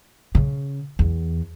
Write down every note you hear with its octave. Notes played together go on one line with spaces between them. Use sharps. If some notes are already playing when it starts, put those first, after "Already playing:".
C#3
E2